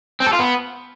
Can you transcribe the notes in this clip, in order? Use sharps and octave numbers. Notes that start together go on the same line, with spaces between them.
C4
A4
F4
B3